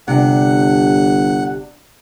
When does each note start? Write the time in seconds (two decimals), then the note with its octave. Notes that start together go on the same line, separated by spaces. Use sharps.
0.08 G1 C3 D4 F#5